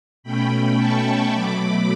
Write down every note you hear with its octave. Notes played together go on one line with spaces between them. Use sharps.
B2 A3 C#4 G5 B5
A5 C#6
B2 F#3 A3 B5 D6